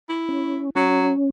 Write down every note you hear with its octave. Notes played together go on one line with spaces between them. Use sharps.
E4
C#4
F#3 C#4